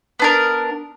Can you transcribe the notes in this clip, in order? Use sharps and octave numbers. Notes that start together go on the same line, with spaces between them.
B3 D4 A#4